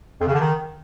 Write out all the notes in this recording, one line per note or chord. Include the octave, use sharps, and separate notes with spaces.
F2
C#3
D3
D#3